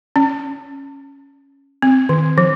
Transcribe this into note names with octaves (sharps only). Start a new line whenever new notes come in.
C#4
C4
D#3
F3